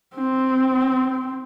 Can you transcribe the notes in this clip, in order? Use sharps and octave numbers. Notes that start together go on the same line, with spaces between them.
C4